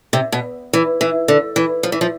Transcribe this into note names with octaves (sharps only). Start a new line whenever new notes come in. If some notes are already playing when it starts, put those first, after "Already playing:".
C3
B2
E3
E3
D3
E3
F3
E3
F3